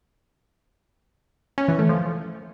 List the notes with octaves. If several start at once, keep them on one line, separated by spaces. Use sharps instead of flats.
C#4
E3
A3
F3